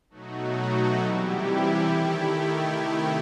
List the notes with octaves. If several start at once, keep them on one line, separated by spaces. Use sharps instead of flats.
B2 F#3 A3 D#4 F#4
C3 E3 G3 E4 G4
D#3 A3
C3 D#3 A3